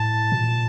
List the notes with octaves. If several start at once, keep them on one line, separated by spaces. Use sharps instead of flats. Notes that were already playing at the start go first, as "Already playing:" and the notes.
Already playing: A2 A5
A#2